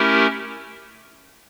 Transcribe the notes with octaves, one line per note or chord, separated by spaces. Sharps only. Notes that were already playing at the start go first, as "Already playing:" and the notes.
Already playing: A3 C#4 E4 G4 A#4